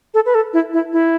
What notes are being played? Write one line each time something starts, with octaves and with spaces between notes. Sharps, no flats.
A4
B4
A4
E4
E4
E4